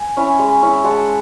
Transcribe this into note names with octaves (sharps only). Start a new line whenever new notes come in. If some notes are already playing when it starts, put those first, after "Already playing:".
Already playing: G#5
C#4 E4
G#3
C#4 E4
G#3 F#5 A5